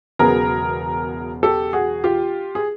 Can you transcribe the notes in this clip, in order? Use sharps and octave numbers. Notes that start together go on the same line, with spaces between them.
E1 E2 C#3 F#3 B3 G#4 A#4
G4 A4
F#4 G#4
F4 G4
G#4